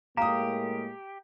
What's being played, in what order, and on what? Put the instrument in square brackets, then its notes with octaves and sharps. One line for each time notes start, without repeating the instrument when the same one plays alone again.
[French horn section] A2 G#3 A#3 [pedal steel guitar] G4 [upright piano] F5 D#6 [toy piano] A#5